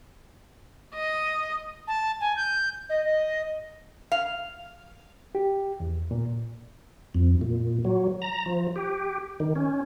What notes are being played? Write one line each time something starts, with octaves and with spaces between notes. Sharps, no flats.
D#5
A5
G#5
G6
D#5
D#5
F5
G4
E2
A#2
F2
A#2
F#3
A#5
F3
G4
D#3
C#4